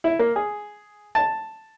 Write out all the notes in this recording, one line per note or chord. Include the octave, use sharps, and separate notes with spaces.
E4
A#3
G#4
A5